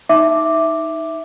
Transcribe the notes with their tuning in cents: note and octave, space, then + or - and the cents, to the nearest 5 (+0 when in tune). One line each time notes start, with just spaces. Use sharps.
D#4 +10 E5 +0 D6 +0